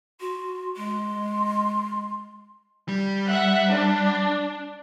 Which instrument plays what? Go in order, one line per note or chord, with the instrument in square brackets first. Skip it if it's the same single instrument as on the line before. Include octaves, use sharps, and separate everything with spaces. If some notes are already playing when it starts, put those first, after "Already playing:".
[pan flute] F#4 [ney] C6
[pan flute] G#3 [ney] C6
[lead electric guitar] G3
[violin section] E5 F#5 F#6
D4